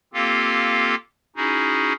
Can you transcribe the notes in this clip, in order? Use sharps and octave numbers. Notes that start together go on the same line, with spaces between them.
A#3 C4 F4 G4 A4 F5
C#4 D#4 E4 F#4 G#4